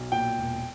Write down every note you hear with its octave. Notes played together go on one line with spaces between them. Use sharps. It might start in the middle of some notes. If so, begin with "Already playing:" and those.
Already playing: B1
A#2 G5
E1